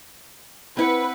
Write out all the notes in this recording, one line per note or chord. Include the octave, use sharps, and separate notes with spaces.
C4 E4 B4 F#5